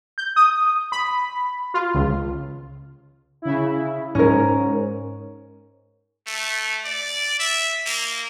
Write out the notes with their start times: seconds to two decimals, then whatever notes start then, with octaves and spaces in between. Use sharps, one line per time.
0.18 G6
0.36 D#6
0.92 B5
1.74 F4
1.94 C#2
3.42 C#3 E4
4.15 G#2 C#4 A#4
6.27 A3
6.85 D5
7.40 E5
7.86 A#3